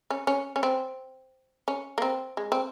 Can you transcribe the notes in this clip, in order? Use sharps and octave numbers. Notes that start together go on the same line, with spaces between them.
C#4
C#4
C#4
C4
C#4
A#3
C4
G#3
C4